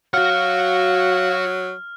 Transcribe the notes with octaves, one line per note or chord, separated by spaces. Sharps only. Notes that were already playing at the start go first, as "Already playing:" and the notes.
F#3 F#4 F5 F#5 F6